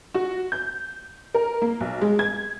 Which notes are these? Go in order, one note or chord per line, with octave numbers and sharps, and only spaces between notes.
F#4
G6
A#4
A#3
B1
G#3
G#6